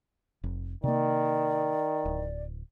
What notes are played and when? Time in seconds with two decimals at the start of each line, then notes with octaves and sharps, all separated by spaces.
0.44 F1
0.84 C3 D#3 A#3 D5
2.05 D1